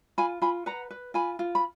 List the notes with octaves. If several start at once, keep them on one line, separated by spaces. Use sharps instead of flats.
F4 G#5 B5
F4 G#5 B5
B4 F#5 A#5
B4
F4 G#5 B5
F4
B5